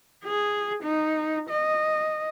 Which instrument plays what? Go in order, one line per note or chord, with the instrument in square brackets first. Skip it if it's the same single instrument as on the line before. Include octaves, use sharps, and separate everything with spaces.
[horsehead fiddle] G#4
D#4
D#5